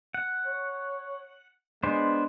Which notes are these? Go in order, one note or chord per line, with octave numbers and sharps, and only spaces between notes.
F#5
C#5
G#3 B3 D4 C5